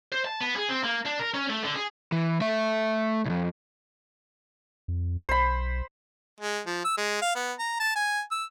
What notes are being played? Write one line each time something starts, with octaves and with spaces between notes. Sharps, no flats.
C5
A5
B3
G#4
C4
A#3
D4
A#4
C#4
A3
D3
G#4
E3
A3 E5
C2 F2
F2
B1 C5 B5
G#3
F3
E6
G#3
F5
B3
A#5
A5
G#5
E6